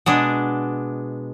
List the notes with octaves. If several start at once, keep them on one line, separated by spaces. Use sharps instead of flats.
B2 G#3 D4